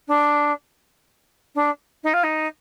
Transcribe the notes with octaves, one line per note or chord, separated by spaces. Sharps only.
D4
D4
D#4
F4
D#4